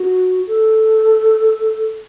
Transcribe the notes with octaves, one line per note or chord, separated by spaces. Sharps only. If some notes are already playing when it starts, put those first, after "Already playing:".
Already playing: F#4
A4